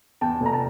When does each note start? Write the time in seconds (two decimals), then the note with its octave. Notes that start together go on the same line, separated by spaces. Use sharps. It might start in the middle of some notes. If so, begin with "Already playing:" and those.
0.21 E2 G5 A5
0.41 F1
0.46 A#5
0.53 A5